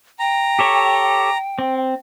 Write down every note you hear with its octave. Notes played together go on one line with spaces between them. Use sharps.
G5 A#5
G4 A4 C#5
C4